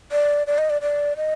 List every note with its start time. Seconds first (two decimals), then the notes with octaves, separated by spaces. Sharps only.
0.12 D5
0.47 D5
0.58 D#5
0.70 D5
0.82 D5
1.17 D#5